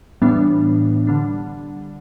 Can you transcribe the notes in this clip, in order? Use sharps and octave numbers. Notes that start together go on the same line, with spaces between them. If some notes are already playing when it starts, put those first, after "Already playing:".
A2 E3 G3 B3 D4
D3 G3 D4